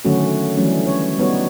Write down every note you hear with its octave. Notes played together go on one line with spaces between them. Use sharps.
D3 D#3 F#3 A3 C#4 F#4
E3 F#3 G3 A3 C#4 D4
C#5
G3 B3 D#4 F#4 C#5